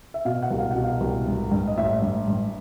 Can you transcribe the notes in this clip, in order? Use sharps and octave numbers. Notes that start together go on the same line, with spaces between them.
E5
B2 F5
F#5
C2
F5
B2 F#5
F5
C2
G2
G2
D#5
A1 E5
G2
G2